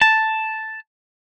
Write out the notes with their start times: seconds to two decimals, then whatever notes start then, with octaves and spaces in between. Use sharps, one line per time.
0.02 A5